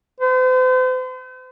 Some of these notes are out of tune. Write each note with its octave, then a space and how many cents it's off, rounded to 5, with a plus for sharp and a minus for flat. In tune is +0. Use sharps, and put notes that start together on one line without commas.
C5 -40